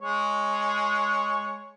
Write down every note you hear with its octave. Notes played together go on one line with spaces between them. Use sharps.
G#3 C#5